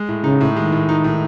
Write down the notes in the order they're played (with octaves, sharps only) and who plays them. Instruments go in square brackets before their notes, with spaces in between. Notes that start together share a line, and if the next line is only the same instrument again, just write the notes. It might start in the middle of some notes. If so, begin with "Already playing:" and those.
Already playing: [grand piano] G#3
A2
[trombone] C#3 [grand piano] D#4
[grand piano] A2
[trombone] D#3 [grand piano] G#3
[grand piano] A2
D#4
A2